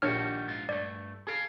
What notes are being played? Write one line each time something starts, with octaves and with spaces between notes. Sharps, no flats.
A#1 D#3 G3 D4 F#4 G4 C#5 F6
G#2 F4
G2 A3 D5
G#4 A4 F5